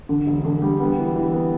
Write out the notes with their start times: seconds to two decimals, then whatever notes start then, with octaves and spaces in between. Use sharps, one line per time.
0.09 D3
0.26 E1
0.45 D3
0.62 G3
0.80 B3
0.98 E3
1.16 E3
1.33 B3